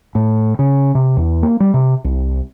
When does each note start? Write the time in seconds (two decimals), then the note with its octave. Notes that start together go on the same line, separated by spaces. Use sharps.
0.15 A2
0.59 C#3
0.95 C3
1.17 E2
1.43 A#3
1.60 G3
1.74 C3
2.04 C2